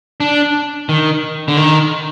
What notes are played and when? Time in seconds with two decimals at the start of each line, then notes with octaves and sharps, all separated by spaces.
0.20 D4
0.89 D#3
1.48 D3
1.57 D#3